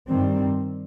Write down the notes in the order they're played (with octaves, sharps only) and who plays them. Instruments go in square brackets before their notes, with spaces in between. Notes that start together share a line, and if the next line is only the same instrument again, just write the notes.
[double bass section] G2 D#3 G3 C4